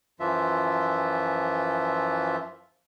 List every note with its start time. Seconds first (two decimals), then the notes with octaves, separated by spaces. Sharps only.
0.20 F#2 E3 F3 F4 E5